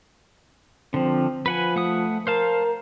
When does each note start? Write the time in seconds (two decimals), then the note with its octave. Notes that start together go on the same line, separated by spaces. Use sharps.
0.94 D3 F3 C4
1.46 F3 B4 F#5 G#5
1.76 A3 F#5 D#6
2.27 A#4 C5 F5 A5